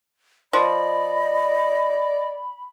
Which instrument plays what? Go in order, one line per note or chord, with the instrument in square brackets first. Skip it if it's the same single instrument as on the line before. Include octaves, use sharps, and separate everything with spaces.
[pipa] F3 [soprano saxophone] D5 [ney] D#5 [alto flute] B5